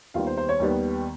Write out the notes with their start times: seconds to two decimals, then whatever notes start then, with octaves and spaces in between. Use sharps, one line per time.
0.14 D#2 D#3 G3 B3 F4 F5
0.27 C5
0.37 C5
0.49 C#5
0.60 D#2 D#3 G3 B3